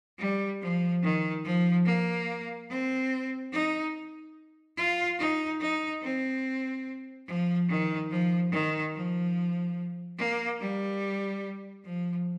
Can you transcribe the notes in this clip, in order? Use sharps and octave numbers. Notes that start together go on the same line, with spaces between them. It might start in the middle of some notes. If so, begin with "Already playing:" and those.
G3
F3
D#3
F3
A#3
C4
D#4
F4
D#4
D#4
C4
F3
D#3
F3
D#3
F3
A#3
G3
F3